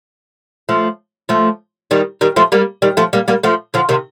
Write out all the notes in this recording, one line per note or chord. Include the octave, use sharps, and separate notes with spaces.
F3 A3
F3 A3
D#3 G3
D#3 G3
F3 A3
G3 A#3
D#3 G3
F3 A3
G3 A#3
G3 A#3
F3 A3
D3 F3
C3 D#3